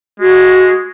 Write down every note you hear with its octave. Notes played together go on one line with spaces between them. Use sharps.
G#3 F#4